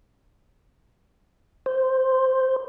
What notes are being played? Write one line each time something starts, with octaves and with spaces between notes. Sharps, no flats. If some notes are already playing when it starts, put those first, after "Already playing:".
C5